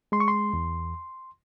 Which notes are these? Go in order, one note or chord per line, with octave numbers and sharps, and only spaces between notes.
G#3 C6
C#6
C6
E2